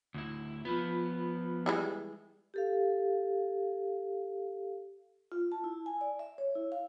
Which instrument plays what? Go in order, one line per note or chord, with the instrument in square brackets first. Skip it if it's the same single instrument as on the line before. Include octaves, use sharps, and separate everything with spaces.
[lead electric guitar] D2 E4
[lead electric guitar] F3 B3 [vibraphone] F4 B5
[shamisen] E3 G3 G#3
[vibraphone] G4 A4 F5
F4
A5
E4
G#5
D5
E5
C#5
E4
F5